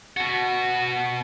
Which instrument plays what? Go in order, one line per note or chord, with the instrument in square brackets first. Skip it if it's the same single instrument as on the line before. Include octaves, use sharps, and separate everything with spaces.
[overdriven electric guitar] B2 F#4